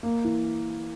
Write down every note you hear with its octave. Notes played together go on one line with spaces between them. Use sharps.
A#3
E3